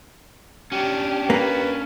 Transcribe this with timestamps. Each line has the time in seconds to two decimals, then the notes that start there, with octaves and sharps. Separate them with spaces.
0.72 C#4 D4 G4
1.30 A#3 B4